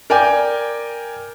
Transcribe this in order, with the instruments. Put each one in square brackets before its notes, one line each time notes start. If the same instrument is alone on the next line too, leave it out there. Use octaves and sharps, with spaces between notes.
[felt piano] A#4 D5 G5 G#5 D6 G6